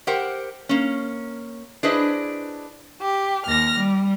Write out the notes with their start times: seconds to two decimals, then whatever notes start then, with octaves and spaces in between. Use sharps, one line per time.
0.07 G4 A#4 C5 F#5 G5
0.69 A#3 C#4
1.83 D4 E4 G#4 B4 C5 D#5
3.02 G4
3.46 D#2 F6 A#6
3.77 G3